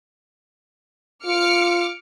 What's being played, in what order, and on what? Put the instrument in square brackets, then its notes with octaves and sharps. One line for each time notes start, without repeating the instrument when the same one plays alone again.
[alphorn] F4 [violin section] D6 F6 C#7